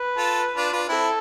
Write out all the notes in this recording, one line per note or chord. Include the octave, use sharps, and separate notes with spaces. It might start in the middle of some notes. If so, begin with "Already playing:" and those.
Already playing: B4
F4 A4
D4 F4
D4 F4
C4 E4 A4